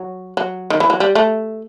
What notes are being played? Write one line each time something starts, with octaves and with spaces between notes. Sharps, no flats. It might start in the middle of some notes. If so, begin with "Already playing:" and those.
Already playing: F#3
F#3
D#3
E3
F#3
G3
A3